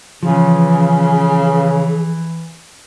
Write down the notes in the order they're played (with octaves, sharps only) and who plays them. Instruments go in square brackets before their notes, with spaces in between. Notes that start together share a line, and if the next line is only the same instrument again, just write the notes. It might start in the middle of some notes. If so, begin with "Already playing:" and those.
[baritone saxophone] C#3 [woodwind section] E3 [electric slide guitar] F3 [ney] G#4